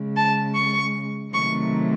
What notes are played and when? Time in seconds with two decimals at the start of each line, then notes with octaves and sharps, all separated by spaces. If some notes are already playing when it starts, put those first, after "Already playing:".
Already playing: C#3 G#3
0.16 A5
0.56 C#6
1.33 C3 D#3 F#3 A3 C#6